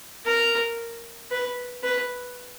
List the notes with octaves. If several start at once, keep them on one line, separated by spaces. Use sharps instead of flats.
A#4
B4
B4